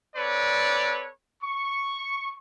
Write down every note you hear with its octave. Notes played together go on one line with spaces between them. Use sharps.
C4 A4 B4 C#5 D5
C#6